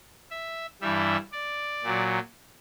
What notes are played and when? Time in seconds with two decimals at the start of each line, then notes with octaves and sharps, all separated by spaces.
0.31 E5
0.81 G2 E3 G3 E5
1.32 D5
1.83 A#2 F#3